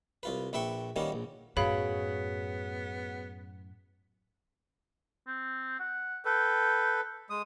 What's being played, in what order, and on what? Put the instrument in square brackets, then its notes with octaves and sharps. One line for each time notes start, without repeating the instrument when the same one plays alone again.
[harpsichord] C2 F4 B4
A#1 B4 E5 G5 C#6
D#3 G3 A#3 B3 C#4
A#1
[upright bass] F#2 A2 [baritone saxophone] B3 [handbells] F#4 G#4 C#5 [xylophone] F5 B5
[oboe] C4
F#5
[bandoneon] A4 B4 [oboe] G5
[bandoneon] G#3 D#6